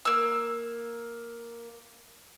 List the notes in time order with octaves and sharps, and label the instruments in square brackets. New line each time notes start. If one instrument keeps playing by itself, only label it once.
[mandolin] A#3 E6